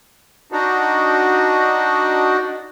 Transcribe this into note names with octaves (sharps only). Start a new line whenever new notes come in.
D4 D#4 F#4